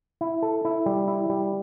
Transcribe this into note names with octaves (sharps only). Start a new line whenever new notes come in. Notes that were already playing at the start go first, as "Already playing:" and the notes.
E4
A4
E4
G3
E4
G3